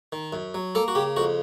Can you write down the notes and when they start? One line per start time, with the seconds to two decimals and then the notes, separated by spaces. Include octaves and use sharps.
0.12 D#3
0.33 F#2
0.54 F#3
0.75 A#3 A4
0.88 F#4
0.95 C#3 G4
1.16 F2 F#4